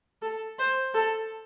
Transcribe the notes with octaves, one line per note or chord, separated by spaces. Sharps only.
A4
C5
A4